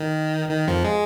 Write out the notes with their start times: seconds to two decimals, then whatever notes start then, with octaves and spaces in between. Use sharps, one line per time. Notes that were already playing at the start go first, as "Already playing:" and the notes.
Already playing: D#3
0.51 D#3
0.68 F2 F3
0.85 G#3